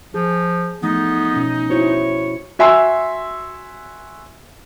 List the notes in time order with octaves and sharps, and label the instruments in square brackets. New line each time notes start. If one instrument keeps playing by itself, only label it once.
[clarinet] F3 [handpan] G#4
[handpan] E3 F3 A3 [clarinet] B3 [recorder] D#4
[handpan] B2 C#4
[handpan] E4 F#4 C5 [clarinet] C#5
[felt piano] F#4 E5 G#5 C6 E6